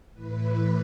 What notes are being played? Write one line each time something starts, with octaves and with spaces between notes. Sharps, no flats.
A2 E3 B4